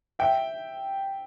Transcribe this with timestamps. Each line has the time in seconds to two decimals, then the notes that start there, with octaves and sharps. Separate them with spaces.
0.19 E5 G5